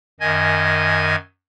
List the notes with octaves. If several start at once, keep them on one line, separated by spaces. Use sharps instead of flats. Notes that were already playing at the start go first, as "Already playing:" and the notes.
F#2 D#3 D#5 G#5 G#6